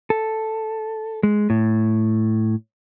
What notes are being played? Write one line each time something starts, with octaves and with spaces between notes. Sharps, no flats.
A4
G#3
A2